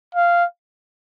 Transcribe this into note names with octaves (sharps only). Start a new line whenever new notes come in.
F5